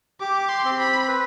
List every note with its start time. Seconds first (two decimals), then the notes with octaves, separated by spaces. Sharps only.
0.20 G4 D6
0.49 C6
0.65 C4
0.79 B5
1.08 B4